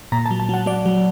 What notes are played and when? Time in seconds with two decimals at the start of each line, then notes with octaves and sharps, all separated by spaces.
0.12 A#2 A#5
0.26 A5
0.31 F#3
0.40 A5
0.49 F#3 F#5
0.66 F#3 D5
0.86 F#3